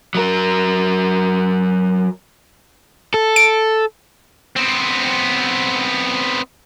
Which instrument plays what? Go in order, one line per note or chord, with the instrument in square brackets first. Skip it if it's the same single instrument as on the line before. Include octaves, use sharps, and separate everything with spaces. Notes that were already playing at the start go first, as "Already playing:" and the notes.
[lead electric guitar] F#3 A#4
[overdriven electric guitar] A4
[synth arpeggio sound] D7
[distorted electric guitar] B3 C4